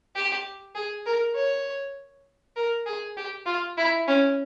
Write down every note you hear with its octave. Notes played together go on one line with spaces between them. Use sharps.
G4
G#4
A#4
C#5
A#4
G#4
G4
F4
E4
C#4